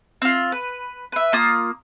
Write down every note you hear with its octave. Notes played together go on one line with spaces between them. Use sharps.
C4 F4
B4
B4 E5
A#3 F4 D#6